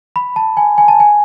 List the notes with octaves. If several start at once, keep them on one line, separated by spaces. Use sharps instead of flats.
B5
A5
G#5
G#5
A5
G#5